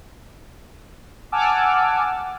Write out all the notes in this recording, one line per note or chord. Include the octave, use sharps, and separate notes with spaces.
F#5 G#5 A5 D6 E6 F6